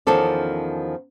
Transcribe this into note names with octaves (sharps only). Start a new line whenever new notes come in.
E2 D#3 F3 C#4 A4 D5